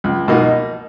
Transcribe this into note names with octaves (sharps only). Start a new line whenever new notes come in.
C#2
B2 A#3 D#4